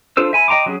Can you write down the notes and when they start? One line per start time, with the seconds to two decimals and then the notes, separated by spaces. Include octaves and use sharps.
0.17 D4 F4 A4 C5 E6
0.33 E5 G#5 B5
0.48 D#5 G5 A#5 C6 D6
0.66 F#3 C#4 G#4